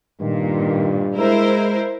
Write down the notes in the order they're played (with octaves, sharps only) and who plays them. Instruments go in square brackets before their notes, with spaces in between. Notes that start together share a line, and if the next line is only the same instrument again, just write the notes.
[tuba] G2 [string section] A#2 [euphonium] D#3
[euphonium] G#3 [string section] E4 A#4 C5